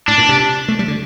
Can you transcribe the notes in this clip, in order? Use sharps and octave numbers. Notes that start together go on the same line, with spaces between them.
A2 D4
A#2
C3
A3
G3
D3